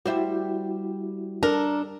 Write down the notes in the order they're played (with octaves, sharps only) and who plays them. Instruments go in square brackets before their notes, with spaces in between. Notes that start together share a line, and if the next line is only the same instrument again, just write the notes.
[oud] G3 C5 E5 [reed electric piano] E4 F#4
[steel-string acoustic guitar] D4 A4 [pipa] A#4